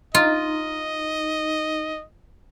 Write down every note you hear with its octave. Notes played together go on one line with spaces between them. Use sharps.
D#4 F4 D#5